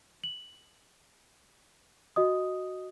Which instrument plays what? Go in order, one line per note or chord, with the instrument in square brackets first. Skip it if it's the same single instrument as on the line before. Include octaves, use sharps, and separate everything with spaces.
[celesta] F#7
F#4 D#5 D#6